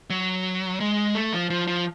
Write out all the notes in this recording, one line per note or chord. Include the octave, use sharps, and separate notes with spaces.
F#3
G#3
A3
F3
F3
F3